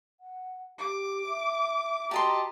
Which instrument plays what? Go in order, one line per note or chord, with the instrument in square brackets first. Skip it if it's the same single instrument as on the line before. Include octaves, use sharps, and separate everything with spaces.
[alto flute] F#5
[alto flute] G4 [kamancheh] D6
[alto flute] E5
[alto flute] F#4 [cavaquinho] G4 D#5 C6 [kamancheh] A5 A#5